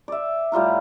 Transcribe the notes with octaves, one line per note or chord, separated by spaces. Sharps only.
D5 E5
A2 G3 F4 A#5